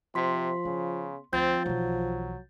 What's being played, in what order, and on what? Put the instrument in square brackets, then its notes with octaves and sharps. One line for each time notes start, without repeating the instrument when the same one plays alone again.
[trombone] C3 [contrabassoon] F3 [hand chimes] C6 B6
[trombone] C#3 [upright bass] B3
[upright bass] D2 [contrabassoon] F3 [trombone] C4 [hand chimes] G6 A6
[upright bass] B1 E3 [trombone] F#3